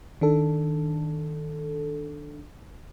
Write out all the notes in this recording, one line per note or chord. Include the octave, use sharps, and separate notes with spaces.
D#3 D4 A4